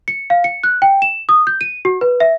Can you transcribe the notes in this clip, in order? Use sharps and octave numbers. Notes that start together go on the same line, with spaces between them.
C#7
F5
C#7
F#6
G5
E7
D#6
G6
D#7
F#4
B4
E5